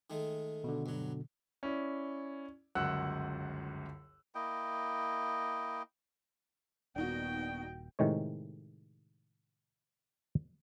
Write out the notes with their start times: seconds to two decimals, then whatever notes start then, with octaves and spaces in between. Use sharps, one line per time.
0.10 D#3 G#3 A3
0.64 B2 D3
0.86 G2 F#3
1.63 C#4 E4 D5
2.75 G1 C#2 F#2 F#5 E6 F#6
4.35 A#3 E4 D#5 G5
6.96 D#1 A#2 B3 D4 D#4 F#4 G5
7.99 A2 C3 D#3 G#3 C#5